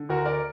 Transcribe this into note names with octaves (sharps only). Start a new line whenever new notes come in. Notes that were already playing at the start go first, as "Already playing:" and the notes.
Already playing: D3
D2 F#4 A#4
A#4 D5